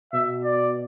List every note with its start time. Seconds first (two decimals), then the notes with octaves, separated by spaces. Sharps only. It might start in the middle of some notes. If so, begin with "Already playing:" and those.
0.13 B2 E5
0.44 D5